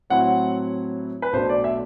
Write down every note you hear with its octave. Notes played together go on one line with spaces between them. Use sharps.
A2 F#3 C4 E4 F#5
B4
B1 B2 A3 D4 C5
D5
E5